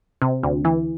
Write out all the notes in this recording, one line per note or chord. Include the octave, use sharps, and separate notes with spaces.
C3
D2
E3